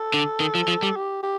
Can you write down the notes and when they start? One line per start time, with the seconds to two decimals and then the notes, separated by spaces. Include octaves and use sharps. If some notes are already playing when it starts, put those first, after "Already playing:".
Already playing: A4
0.14 D3
0.40 D#3
0.55 F3
0.68 F3
0.83 G3
0.96 G4
1.23 G4